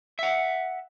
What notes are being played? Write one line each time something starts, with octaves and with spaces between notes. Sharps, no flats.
E5 F#5